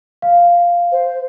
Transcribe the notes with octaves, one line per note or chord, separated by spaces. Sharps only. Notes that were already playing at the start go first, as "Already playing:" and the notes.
F5
C5